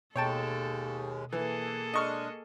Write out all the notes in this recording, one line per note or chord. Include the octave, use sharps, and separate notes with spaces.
D#2 B2 G#3 A4 C#5 G5 A5
E3 A#3 G#4 A4
G#3 D4 D#5 C#6 F6